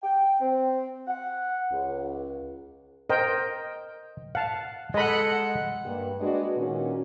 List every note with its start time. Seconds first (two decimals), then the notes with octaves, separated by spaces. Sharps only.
0.03 G5
0.40 C4
1.08 F#5
1.71 C#2
3.10 A#4 C5 D#5 G5
4.35 F5 F#5 A5
4.94 G#3 A4 D#5 F#5 B5
5.85 G2 A#3 G4
6.20 G#3 D4 F#4 B4 D5 D#5
6.57 A#2 D#3 C#4 F#4